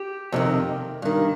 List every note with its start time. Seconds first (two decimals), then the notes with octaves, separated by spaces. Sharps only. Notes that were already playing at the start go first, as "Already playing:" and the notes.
Already playing: G4
0.32 F2 C3 D#3
1.02 G2 D#3